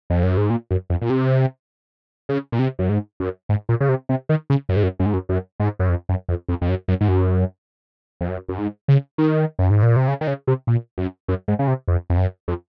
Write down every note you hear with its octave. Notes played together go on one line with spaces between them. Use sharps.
F2
F#2
G#2
A#2
F#2
F2
A#2
C3
C#3
A#2
C3
F#2
G#2
F#2
G#2
A#2
C#3
C3
C3
D#3
C#3
F#2
G#2
F#2
F#2
G#2
F#2
F#2
G#2
F#2
F2
F#2
F2
F2
F2
F#2
F#2
G#2
F#2
F2
F#2
F#2
G#2
C#3
D#3
F#2
G#2
A#2
C3
C#3
D#3
C#3
C3
A#2
F#2
F#2
G#2
C#3
C3
F2
F2
F#2
F2